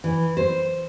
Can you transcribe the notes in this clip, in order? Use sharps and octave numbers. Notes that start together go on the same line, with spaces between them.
E3
C5